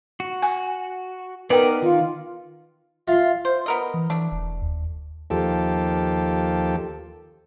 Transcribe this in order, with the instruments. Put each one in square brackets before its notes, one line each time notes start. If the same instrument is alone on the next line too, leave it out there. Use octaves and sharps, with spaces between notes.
[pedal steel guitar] F#4
[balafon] G#5
[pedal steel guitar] B3 D#4 D5 [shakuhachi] A#4 [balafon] B4 G5
[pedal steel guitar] D#3 [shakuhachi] F4
[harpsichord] F4 C6 [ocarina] E5
[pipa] C5
B3 A#4 D#5
[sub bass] E3
[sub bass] E3 [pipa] A3 D4
[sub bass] E1
D#2
[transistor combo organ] D#2 F3 G4 A4